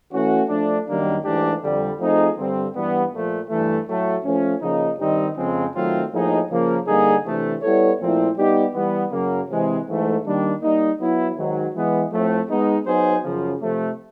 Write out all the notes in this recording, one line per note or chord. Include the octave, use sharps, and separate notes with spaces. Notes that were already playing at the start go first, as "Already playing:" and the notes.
E3 A3 C#4 F#4
F3 A3 D4
F#2 D#3 G3 A#3 D4
G#2 E3 A3 D4 G4
F2 D3 G3
F3 A3 C4 D#4 G#4
G2 D3 G3 C4
G2 E3 G3 B3
A#2 F3 A3
G2 E3 A3
A2 F#3 A3
F3 A3 C#4
C#3 F3 A#3 D#4
G2 D#3 G3 C4 D#4
F2 C#3 F3 G#3 C4
D#3 F#3 A3 C4 F4
A2 F3 A#3 D#4 G#4
C#3 F3 A#3
D3 G3 A#3 D#4 G#4
C3 E3 A3 D4
G3 B3 E4 A4 C#5
A#2 F3 A3 C4 E4
G3 B3 D#4 G4
E3 G3 B3
F#2 C#3 F#3 A#3
C3 E3 G#3 C4
G#2 E3 A3
D#3 G3 A#3 D4
G3 A#3 D#4
F#3 B3 E4
G#2 D#3 F#3
E3 G#3 B3
A2 F3 A3 C4
G#3 B3 D#4
F#3 B3 D#4 G#4 C5
F#2 C#3 F3
C3 F3 A3